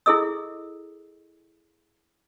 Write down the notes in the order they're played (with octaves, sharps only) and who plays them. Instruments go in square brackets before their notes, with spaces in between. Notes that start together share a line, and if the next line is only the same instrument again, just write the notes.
[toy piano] E4 G#4 A4 D#5 E6